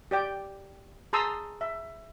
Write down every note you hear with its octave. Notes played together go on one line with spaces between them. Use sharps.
G4 D5 G5
G#4 A5 A#5 C6 D#6 E6
E5